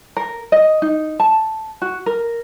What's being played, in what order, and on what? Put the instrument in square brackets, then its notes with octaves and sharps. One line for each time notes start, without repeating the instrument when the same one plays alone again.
[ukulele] A#4
D#5
D#4
A5
F#4
A#4